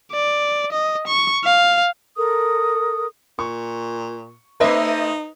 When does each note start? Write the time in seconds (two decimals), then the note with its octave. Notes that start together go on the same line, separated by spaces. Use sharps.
0.12 D5
0.72 D#5
1.07 C#6
1.44 F5
2.17 A4 A#4 D#6
3.39 A#2 C#6
4.60 A3 D#4 B4 C5 D#5 E5